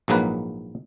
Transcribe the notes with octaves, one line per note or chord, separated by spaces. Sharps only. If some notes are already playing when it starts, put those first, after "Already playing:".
A#1 G#2 F#3 A#3 B4